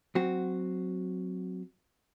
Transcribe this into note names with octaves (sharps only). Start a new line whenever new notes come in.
F#3 C4 F#4